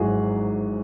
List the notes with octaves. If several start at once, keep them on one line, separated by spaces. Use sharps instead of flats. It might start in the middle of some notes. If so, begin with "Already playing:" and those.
Already playing: G#1 G#2 F#3 E4 F#4 G#4